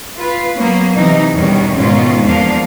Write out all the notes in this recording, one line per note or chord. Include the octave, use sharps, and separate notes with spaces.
F4 B4
F#3 A#3 B3 C#4
C3 E3 D#4
E2 G2 B2 D#3 G3 C#4
G#2 B2 D#3 C#4 F4
E2 F3 A#3 D4 F5